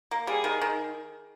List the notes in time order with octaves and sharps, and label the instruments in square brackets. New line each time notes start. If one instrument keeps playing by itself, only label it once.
[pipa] A#3
[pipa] G3 [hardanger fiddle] G#4
[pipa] D#3
D#3